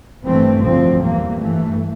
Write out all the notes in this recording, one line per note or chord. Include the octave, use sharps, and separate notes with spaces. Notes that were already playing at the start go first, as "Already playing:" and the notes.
G1 G2 E3 A3 C4
D2 D3 F3 C4
E2 E3 G3 A#3
G2 E3 A3